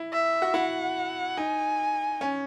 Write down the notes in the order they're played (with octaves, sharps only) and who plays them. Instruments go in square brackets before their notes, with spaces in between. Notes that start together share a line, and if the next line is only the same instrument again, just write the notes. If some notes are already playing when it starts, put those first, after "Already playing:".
Already playing: [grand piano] E4
[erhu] E5
[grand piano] F#4
[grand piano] E4 [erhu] F#5
[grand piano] D#4 [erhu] G#5
[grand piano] C#4